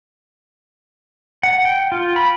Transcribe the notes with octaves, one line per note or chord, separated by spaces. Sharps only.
F#5
G5
F4
B5